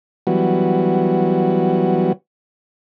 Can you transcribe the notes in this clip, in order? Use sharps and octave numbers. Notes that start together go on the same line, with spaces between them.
E3 F#3 G3 B3 F#4